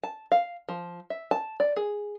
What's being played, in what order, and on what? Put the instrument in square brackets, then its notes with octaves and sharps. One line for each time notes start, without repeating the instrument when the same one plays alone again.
[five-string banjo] A5
F5
F3
E5
A5
D5
G#4